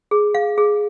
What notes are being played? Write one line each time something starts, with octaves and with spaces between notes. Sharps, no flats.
G#4
F5
G#4